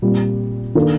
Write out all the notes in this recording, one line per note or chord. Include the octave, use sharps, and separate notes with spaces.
A#2 G3 C4 F4
D#3 A#3 D4 A4